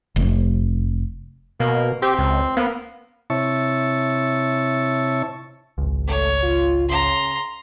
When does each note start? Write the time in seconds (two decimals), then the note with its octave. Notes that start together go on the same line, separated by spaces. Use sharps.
0.16 F1
1.60 B2 A#3
2.02 C4 G4
2.19 C#2
2.57 A#3 B3
3.30 C3 E4 C#5 E5 A5 C#6
5.78 G#1 C#2
6.08 D3 A3 C#5
6.43 F4
6.89 C#3 A#5 C6